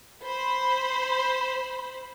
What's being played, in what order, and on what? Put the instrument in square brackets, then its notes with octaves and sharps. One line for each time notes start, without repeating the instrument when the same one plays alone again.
[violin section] C5 B5